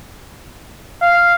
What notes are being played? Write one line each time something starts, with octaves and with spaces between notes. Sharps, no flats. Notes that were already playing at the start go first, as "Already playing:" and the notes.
F5